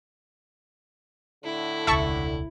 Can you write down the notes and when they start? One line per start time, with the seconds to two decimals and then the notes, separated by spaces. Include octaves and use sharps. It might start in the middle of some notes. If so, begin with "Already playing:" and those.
1.44 A2 D3 E4
1.87 E1 C#2 E5 A5 C#6